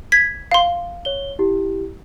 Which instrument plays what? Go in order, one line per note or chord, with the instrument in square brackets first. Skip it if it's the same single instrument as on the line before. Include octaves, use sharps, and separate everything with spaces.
[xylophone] G#6 B6
F5 C6
[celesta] C#5 G7
E4 G4